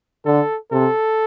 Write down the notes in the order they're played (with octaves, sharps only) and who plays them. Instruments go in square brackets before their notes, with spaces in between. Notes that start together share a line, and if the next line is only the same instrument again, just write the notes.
[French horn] D3 [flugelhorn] A4
[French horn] C3 [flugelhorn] A4